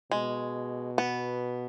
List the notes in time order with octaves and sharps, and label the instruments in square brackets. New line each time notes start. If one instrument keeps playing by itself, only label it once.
[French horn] B2 [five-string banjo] G#3
[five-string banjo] B3